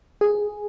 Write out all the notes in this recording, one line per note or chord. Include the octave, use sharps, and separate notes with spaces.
G#4